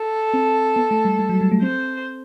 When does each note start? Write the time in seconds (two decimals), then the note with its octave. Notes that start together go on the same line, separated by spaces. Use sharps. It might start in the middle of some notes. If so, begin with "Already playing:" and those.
Already playing: A4
0.34 C4
0.76 B3
0.91 A3
1.05 G3
1.19 G3
1.29 F#3
1.41 G3
1.51 A3
1.62 C4 C5